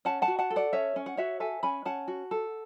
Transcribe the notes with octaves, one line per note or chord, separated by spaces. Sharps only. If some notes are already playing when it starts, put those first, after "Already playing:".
C#4 F#5 A5
F#5 A5
F#4
F#5 A5
A4
D5 F#5
C#4 C#5 E5
C#4
F#5
F#4 C#5 E5
A4 E5 G#5
C#4 G#5 B5
C#4 F#5 A5
F#4
A4